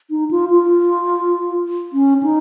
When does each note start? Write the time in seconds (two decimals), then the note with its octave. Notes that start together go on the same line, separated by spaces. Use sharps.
0.10 D#4
0.31 F4
0.51 F4
1.93 C#4
2.23 D#4